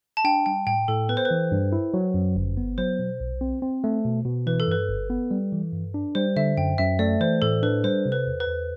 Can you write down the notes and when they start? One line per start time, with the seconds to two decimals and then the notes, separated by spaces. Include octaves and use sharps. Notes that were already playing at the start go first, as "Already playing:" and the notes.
0.17 A5
0.25 D4 G5
0.46 G3 G5
0.67 A2 G5
0.88 A2 A4
1.09 B3 B4
1.17 C5
1.25 B4
1.31 E3
1.52 G2
1.72 E4
1.94 F#3
2.14 F#2
2.36 G1
2.57 B3
2.78 F#3 C5
2.99 B2
3.20 B1
3.41 C4
3.62 C4
3.84 A3
4.05 B2
4.25 B2
4.47 E3 B4
4.60 A4
4.68 G2 B4
4.89 G1
5.10 B3
5.31 G3
5.52 E3
5.73 G2
5.94 D4
6.15 G3 C5
6.36 D3 E5
6.57 F#2 G5
6.78 F#2 E5
6.99 A3 D5
7.21 E3 C5
7.42 A2 A4
7.63 D4 B4
7.84 G3 C5
8.06 C3
8.12 B4
8.26 E2
8.40 B4
8.47 E2